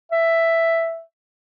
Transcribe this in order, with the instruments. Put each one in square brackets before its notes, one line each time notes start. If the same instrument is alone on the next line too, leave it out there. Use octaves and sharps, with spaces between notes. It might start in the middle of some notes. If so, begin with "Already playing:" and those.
[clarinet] E5